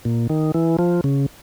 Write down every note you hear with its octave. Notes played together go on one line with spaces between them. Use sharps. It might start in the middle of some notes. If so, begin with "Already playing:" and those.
A#2
D#3
E3
F3
C#3